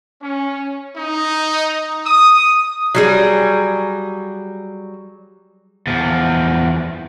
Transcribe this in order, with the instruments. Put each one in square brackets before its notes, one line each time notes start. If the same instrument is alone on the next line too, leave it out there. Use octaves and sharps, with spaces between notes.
[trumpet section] C#4
D#4
D#6
[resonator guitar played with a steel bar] F#3 G3 G#4
[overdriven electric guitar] E2 F3